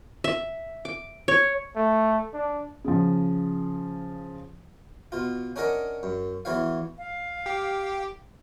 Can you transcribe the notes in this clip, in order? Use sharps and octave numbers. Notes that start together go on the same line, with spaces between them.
E5
D6
C#5
A3
D4
C#3 F3
B2 F4
C#4 D4 G#4 A#4 D#5 F#5
F#2
E2 E3 F#4 C#5 F5
F5
G4